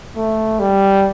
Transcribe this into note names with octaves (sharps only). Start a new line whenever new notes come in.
A3
G3